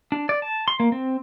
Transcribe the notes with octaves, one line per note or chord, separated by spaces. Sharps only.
D4
D5
A5
C6
A#3
C4